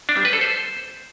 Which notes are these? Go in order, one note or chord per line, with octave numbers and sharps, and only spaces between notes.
D4
G3
B4
A4
C5